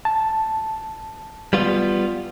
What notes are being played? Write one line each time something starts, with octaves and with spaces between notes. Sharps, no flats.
A5
G3 B3 F4